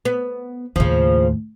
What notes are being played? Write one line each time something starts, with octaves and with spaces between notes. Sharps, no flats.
B3
D#2 A2 C#3 F3